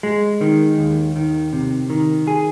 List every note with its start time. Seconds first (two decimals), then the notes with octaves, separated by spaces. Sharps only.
0.03 G#3
0.41 D#3
0.78 D#2
1.16 D#3
1.53 C3
1.90 D#3
2.27 G#4